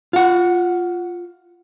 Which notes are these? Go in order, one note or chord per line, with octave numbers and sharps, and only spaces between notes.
F4 F#5